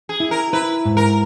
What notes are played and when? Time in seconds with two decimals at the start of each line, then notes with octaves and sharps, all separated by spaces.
0.09 G#4
0.20 E4
0.31 A#4
0.53 E4 B4
0.85 G#2
0.97 A#4